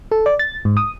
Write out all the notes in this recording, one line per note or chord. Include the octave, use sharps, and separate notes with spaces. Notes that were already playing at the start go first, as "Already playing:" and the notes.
A4
D5
A6
G#2
D#6